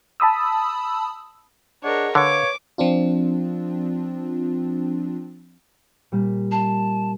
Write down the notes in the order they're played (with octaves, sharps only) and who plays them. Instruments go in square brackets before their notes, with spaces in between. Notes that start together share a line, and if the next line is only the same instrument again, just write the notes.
[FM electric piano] A5 B5 D#6 E6
[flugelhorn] D4 [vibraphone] G#4 D#5 F#5 [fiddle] A#4 C#5
[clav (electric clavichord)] D3 [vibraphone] B4 F5 [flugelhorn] C#5 [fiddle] D6
[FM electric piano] F3 C4 D4 F4
[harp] A#2 G3
[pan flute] A5 [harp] C7